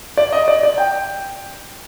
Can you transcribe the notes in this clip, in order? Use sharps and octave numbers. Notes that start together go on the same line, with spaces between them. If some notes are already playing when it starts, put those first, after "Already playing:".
D5
D#5
D5
D5
G5